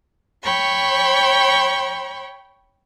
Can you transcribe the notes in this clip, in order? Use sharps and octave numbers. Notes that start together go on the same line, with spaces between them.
C#5 G5 B5 C#6